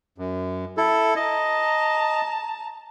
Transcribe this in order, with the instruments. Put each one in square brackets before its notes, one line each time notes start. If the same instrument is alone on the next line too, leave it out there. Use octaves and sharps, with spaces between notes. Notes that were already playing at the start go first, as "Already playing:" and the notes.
[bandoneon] F#2
E4 A4
[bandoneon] D#5 [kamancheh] A5 A#5